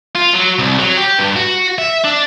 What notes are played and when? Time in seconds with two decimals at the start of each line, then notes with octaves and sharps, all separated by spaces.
0.15 F4
0.34 F#3
0.59 C2
0.79 F#3
0.97 G4
1.19 G2
1.36 F#4
1.78 E5
2.05 D4